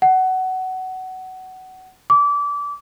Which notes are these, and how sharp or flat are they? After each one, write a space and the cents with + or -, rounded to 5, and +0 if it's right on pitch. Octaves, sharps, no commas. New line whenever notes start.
F#5 +20
D6 -25